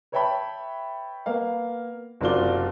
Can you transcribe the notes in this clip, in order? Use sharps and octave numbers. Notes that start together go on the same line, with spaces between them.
B4 C#5 E5 G5 A5 B5
A#3 B3 F5
F#1 C3 F#3 F4 D5 G7